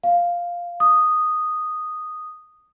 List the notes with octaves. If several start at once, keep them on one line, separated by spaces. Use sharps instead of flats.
F5
D#6